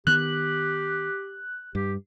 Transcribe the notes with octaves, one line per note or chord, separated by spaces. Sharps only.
D#3 B3 G4 F#6
G2 G4